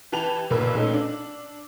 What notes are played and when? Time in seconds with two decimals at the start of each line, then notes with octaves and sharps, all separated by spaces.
0.12 E3 G4 B4 A5 F7
0.50 B1 A#2 A#3 B4 E6
0.75 A#2 A3 C#4 D#4
0.94 D4